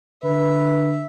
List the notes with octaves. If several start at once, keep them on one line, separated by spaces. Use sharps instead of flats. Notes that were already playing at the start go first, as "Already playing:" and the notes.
D3 B4 E5